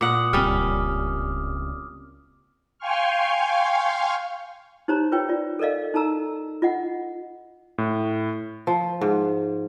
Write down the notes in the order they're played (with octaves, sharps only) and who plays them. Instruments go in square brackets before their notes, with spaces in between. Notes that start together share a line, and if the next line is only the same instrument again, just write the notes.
[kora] A#2 F#5 [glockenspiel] D6 D#6
[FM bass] D1 [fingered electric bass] C#2 C4 [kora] G3 C#4 [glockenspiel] F6
[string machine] F5 G5 G#5 C6 C#6 F6
[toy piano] D#4 G4 C5 C#5 A#5
F4 B4 C#5 G5
F4 D5
A4 A#4 D5 D#5 F5
D#4 A4 A5 A#5 E6
F4 D#5 F#5
[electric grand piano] A2
[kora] F3
G#2